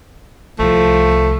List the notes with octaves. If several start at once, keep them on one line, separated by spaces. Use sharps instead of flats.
C2 F3 A3